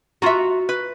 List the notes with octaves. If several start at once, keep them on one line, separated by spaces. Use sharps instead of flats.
F4 F#4 E5 A#5
B4